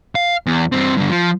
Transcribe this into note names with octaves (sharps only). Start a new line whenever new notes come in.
F5
E2
G2 C4
G2 D3
F3